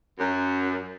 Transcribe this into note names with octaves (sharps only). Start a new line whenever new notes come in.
F#2